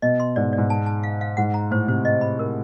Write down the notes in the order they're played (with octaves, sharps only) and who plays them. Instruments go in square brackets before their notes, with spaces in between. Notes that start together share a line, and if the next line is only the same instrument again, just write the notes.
[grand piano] B2 [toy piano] D#5
[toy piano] C6
[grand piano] G#2 [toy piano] D5
[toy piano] D5
[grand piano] G#2
[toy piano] A5
A5
F5
F5
[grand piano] G#2 [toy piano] F#5
[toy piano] A#5
[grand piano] A2 [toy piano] C5
[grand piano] C3 [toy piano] C5
[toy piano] D#5
B5
A#4